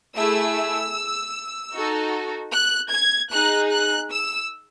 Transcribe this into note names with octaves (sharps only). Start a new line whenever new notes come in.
A3 E4 G#4 E6
D#4 F#4 A4
F#6
G#6
D#4 G#4 F#6
F#6
E6